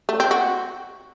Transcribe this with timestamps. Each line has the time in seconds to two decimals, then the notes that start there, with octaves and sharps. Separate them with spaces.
0.09 A3
0.20 C4
0.31 F#4